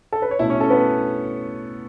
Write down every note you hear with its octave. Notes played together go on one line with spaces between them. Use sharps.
A4
B4
C#5
B2 A3 C#4 E4 E5
C#4 C#5
A4
B3 B4